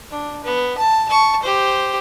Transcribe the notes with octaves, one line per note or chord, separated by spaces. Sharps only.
D4
B3
A5
A5 C#6
G4 C5